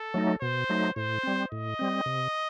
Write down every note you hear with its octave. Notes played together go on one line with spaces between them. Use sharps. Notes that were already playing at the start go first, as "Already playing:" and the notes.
Already playing: A4
F#3 A3 D#4
B2 C5
F#3 A3 D#4
A2 C5
G3 C4
A2 D#5
G3 C4
C3